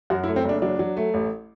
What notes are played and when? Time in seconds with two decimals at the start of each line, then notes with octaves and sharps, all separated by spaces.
0.10 F#2 F#4
0.24 E4
0.28 A3
0.36 C4
0.45 F#1 D4
0.62 F#3 D4
0.79 F#3
0.97 A3
1.14 A1